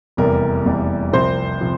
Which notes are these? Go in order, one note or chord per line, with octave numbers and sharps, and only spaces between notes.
F1 E2 C3 G3 A#3 A#4
F1 E2 C3 G3 A#3
C2 C3 F3 C4 C5
C3 F3 C4